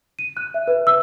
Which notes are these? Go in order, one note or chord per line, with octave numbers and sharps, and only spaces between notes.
D#7
F#6
E5
B4
E6